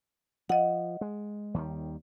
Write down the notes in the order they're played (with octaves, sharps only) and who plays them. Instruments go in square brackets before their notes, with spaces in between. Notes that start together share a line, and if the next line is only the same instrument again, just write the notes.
[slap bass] F3 [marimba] D#5 F#5
[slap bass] G#3
D#2 D#3 G3